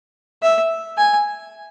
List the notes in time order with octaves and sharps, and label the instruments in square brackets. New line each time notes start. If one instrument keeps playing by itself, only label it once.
[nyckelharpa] E5
G#5